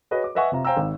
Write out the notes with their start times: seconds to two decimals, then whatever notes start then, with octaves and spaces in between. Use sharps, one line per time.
0.11 F#4 G#4 B4 C#5 D#5
0.24 D6
0.35 B4 D#5 E5 F#5 G#5 C#6
0.52 C3 F4 A#5
0.65 C5 F5 G5 G#5 A#5 E6
0.77 G#1